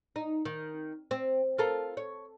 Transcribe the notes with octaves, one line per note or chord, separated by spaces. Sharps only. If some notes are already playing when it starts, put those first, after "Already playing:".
D#4
D#3
C4
F4 A4 A#4
C#5